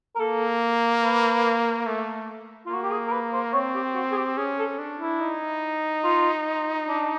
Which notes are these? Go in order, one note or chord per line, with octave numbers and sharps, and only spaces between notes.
A#4
A#3 A4
B4
A3
F4
A#3 F#4
G4
G#4
A#4
B4
C5
C4 C#5
G4
F#4
G#4
G4
C#4 G#4
A4
D4
E4
D#4
F4
D4